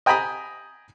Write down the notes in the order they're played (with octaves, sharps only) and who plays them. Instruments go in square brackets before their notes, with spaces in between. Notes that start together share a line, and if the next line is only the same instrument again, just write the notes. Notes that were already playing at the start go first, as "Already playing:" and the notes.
[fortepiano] D#5 G5 G#5 A#5 B5 D#6